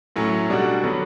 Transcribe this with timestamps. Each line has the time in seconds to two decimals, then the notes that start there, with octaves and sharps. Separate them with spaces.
0.16 A2 F#3 A3 C#4
0.49 B2 G3 D4 F#4
0.83 D3 F#3 B3 D4